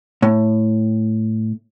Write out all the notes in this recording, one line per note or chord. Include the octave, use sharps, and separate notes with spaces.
A2